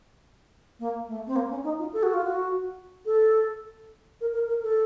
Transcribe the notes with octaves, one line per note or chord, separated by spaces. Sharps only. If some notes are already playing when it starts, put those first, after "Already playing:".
A#3
A3
C4
A#3
C#4
D#4
F4
A4
F#4
F4
F#4
A4
A#4
A#4
A#4
A4